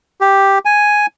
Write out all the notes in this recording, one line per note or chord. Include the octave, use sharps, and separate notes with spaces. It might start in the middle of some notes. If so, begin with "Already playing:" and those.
G4
G#5